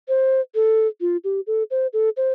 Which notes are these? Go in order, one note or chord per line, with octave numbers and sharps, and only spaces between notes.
C5
A4
F4
G4
A4
C5
A4
C5